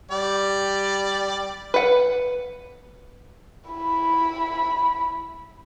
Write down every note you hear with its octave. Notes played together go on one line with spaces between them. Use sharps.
G3 G4 D5
B4 F#5
E4 B5